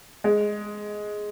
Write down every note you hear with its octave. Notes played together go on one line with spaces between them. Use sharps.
G#3